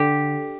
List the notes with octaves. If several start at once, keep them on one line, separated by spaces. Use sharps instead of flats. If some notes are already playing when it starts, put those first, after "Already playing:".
Already playing: D3 G4